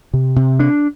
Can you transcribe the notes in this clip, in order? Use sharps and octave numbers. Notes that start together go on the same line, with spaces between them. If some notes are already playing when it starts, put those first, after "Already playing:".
C3
C3
D4